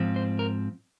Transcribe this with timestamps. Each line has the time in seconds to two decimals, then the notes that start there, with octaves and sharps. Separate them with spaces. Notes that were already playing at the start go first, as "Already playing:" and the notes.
Already playing: G#2 F3 C4
0.16 C5
0.39 A#4